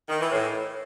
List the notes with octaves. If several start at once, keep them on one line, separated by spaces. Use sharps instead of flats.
D#3
E3
A2